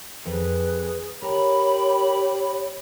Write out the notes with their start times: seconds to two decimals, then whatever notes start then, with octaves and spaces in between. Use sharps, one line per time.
0.25 F2 G#4 B4
1.22 G4 A#4 C#5 B5